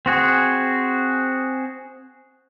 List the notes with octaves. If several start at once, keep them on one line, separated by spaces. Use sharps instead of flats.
C4 F#4 G#4